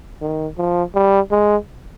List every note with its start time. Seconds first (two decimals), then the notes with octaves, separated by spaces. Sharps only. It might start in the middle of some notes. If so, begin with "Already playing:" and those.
0.21 D#3
0.58 F3
0.95 G3
1.31 G#3